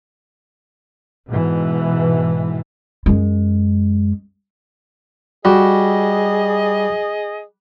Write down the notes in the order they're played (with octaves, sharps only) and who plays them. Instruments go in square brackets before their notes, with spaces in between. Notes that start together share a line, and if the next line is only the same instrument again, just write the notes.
[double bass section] G#2 B2 E3
[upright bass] F#2 G#3
[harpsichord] G3 [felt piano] F#4 [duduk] G#4 [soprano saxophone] D#5